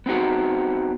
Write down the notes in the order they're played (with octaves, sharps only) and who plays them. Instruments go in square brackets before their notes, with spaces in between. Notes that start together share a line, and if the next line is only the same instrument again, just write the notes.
[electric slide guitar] B3 C4 D#4 F#4